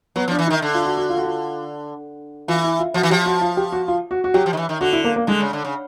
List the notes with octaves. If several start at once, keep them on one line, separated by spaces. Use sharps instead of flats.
F#3 B3
F3
D4
E3
D#4
D#3
D3
F4
F#4
F#4
F4
F#4
F4
E3 F4
E4
F4
F3 F#4
E3
F3 G4
F#4
F4
G4
F#4
F4
F#4
F#4
F#3 G4
F3
D#3
E3
D#3
D3 F#4
E4
A#3
A#3
D3 G#3
C#3
D3
C#3